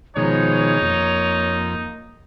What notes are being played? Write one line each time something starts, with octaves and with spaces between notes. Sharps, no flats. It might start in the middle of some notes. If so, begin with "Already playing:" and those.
B2 D#3 F3 G#3 D#4 C#5
F2 A#3